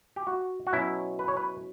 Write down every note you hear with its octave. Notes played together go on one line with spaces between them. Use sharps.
G4
F#4
F#4
B2 F#3 C#4 E4
B4
C#5
B4